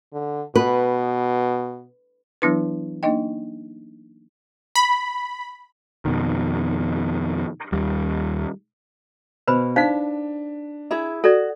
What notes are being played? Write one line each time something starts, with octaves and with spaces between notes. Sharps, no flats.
D3
B2 B4
E3 F#3 B3 D4 E4 B4
A#3 D4 D#4 D#5 G5
B5
F2 B2 D#3
D#2 G3
B2 B4 C5 B5
D4 D#4 C5 F5 B6
E4 G#4 E5
F#4 A4 D5